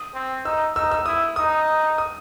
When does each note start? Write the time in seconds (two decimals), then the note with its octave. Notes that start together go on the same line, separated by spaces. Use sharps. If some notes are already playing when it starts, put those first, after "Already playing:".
Already playing: D#6
0.14 C4
0.45 D#4 E6
0.75 D#4 E6
0.91 E6
1.06 E4 D#6
1.36 D#4 D#6
1.98 D#6